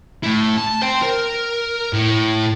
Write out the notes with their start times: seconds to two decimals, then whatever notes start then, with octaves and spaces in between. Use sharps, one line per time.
0.23 A3 E4
0.58 A5
0.82 C5 G5
1.03 A#4
1.93 A2